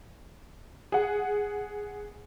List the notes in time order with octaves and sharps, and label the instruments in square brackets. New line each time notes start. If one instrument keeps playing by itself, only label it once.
[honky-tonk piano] G#4 F#5